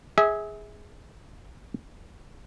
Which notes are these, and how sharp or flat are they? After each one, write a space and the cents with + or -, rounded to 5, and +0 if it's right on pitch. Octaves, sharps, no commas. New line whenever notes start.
G#4 +0 E5 -30